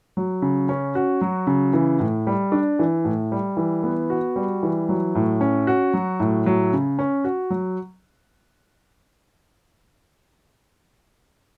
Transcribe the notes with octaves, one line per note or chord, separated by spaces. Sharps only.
F#3
C#3
C#4
F#4
F#3
C#3
E3
A2
G3
D4
E3
A2
G3
E3
B3
F#4
G3
E3
F#3
A2
C#4
F#4
F#3
A2
F#3
C#3
C#4
F#4
F#3